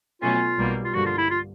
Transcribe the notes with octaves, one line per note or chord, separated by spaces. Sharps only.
B2 F#3 A3 C#4 F4
B1 B2 G3 A#3
F4
G2 D3 F3 A#3 F#4
F4
E4
F4